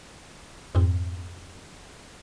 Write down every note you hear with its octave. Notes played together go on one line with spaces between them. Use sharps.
F2 G#2 C4